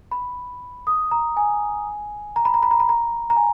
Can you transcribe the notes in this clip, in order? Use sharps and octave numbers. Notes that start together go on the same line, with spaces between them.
B5
D#6
A#5
G#5
A#5
B5
A#5
B5
A#5
B5
A#5
A#5
G#5